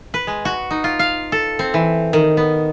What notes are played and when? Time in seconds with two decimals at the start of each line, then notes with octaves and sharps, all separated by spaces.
0.14 B4
0.27 G#3
0.45 F#4
0.71 D#4
0.84 F4
0.99 F5
1.32 A4
1.59 C4
1.74 E3
2.13 D#3
2.37 B3